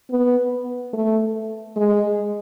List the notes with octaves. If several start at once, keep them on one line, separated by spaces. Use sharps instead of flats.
B3
A3
G#3